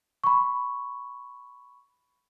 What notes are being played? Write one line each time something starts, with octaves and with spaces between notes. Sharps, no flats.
B5 C#6